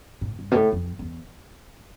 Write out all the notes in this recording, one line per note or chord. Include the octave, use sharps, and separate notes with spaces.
A2
G2
B2
A2
F2
E2